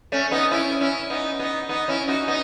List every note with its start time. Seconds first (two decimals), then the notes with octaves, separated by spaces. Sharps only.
0.12 A3 C#4
0.31 B3 D#4
0.51 C#4 E4
0.81 C#4 E4
1.10 B3 D#4
1.39 B3 D#4
1.69 B3 D#4
1.88 C#4 E4
2.08 D#4 F#4
2.28 B3 D#4